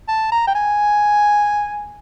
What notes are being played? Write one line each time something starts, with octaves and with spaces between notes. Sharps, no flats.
A5
A#5
G5
G#5